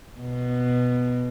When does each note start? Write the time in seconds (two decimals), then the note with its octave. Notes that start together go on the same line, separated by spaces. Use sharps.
0.20 B2